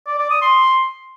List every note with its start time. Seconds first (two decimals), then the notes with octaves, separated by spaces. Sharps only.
0.07 D5
0.19 D5
0.30 D#6
0.42 C6